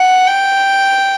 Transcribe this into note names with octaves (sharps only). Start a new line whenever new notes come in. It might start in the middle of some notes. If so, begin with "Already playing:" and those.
Already playing: F#5
G5